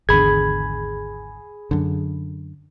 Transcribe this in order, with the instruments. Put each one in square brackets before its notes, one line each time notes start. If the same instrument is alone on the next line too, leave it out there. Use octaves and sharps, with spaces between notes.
[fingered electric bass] G#1 E2 D3 [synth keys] G#4 [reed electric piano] B5 G#6
[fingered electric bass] F#2 D3